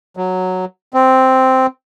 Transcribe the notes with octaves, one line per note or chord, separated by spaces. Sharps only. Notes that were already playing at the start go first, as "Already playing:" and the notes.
F#3
C4